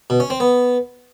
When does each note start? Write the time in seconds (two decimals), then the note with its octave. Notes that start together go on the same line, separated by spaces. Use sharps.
0.10 B2
0.20 C#4
0.30 C4
0.40 B3